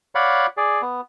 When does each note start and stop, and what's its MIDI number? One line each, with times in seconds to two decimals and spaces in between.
0.15 0.47 73
0.15 0.47 74
0.15 0.47 77
0.15 0.47 78
0.15 0.47 83
0.57 0.82 68
0.57 0.82 74
0.82 1.01 59